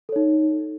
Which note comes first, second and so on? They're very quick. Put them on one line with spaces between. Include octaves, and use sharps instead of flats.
A4 C#5 D#4